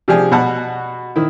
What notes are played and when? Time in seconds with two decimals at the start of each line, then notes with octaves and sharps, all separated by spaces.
0.08 C3 F3 D4 G4 G#4
0.31 B2 F#4 F#5 A5
1.16 D#3 E4